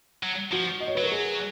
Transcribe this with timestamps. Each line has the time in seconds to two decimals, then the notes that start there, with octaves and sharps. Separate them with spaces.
0.23 F#3
0.52 F3 F#4
0.80 D#5
0.87 C#5
0.95 F#3 B4
1.03 A#4
1.12 G#4